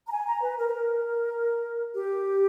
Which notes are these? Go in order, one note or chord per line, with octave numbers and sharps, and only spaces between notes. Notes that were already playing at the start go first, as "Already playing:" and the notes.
A#5
G#5
A#5
B4
A#4
B4
A#4
G4